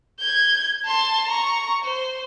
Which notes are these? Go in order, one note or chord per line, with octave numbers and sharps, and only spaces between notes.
G6 G#6
A5 C6
A#5 C#6
C5